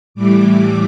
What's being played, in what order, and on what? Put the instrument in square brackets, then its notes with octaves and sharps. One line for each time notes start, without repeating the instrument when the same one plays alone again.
[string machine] A2 E3 G3 D6